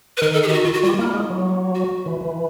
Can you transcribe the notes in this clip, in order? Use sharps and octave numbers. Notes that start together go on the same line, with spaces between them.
B4
D#3 A#4
A4
G#4
G4
F#4
F4
F#4
G3 F4
A#3 E4
G#3
F#3
F#4
E3
E3